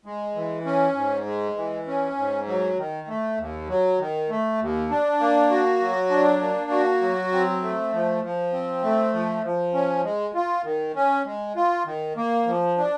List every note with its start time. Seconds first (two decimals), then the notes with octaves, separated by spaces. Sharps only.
0.06 G#3
0.35 E3
0.65 C#4
0.95 G#2
1.26 G#3
1.56 E3
1.87 C#4
2.17 G#2
2.47 F#3
2.78 D#3
3.08 A3
3.38 D#2
3.68 F#3
3.99 D#3
4.29 A3
4.60 D#2
4.90 D4
5.20 A#3
5.50 F#4
5.80 F#3
6.10 D4
6.41 A#3
6.71 F#4
7.01 F#3
7.33 C4
7.62 A3
7.93 F3
8.23 F3
8.53 C4
8.83 A3
9.13 F3
9.44 F3
9.74 C#4
10.04 G#3
10.35 F4
10.65 D#3
10.95 C#4
11.25 G#3
11.56 F4
11.86 D#3
12.16 A#3
12.46 F3
12.78 D4